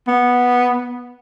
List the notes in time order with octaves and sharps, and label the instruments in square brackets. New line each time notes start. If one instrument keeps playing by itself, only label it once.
[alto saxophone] B3